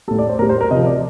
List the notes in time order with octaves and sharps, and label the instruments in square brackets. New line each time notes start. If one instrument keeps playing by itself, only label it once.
[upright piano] G3 A4
A2
D5
C5
A2 A#4
G3
C5
A#4
C3 D#5
F3
D5